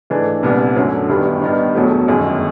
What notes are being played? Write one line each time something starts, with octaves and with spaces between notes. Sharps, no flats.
G#2 E3 A3 D4
C2 A#2 G3 B3
F#2 D3 F#3 A3
G1 G2 D#3 G3 B3
G2 D#3 G3 B3 D#4
E1 E2 B2 F#3 A3
G1 F#2 D#3 G#3